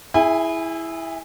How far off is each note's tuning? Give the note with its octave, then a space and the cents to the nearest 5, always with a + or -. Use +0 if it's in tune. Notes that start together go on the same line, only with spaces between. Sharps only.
E4 +0 G#4 +5 G#5 -40